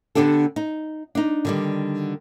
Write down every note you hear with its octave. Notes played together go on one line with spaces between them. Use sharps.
D3 B3 D4 G4 A4
D#4
D4 D#4
D3 D#3 G3